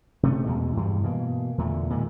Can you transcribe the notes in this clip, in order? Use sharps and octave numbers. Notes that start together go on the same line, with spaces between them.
C3 A3 C#4
E2 B2 G#3
G2 E3 G3 G#3
B2 E3 A#3
E2 A#2 D3 A3
A#2 D#3 G#3